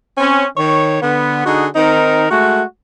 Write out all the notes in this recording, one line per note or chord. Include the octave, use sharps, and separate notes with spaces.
C4 C#4
D#3 C#5
D3 B3
D3 D#4 F#4 G#4
D#3 C4 D#4 A#4
G#3 A3 F#4